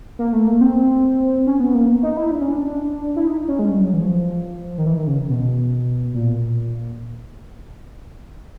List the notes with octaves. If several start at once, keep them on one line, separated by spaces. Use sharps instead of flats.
A#3
A3
A#3
C4
C#4
B3
A#3
D#4
E4
D4
C#4
D4
E4
D#4
C#4
G#3
G3
F#3
E3
F3
D#3
E3
D#3
C#3
B2
A#2